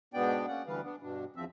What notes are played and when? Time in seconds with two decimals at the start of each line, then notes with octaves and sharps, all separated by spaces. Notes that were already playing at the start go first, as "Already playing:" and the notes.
0.14 G#2 B2 B3 D4 D5 G5
0.48 A#3 C#4 D5 F#5
0.67 D2 D3 E3 G3 B4 F5
0.84 B3 D4
1.02 G2 B2 D4
1.36 E2 F3 C4 E5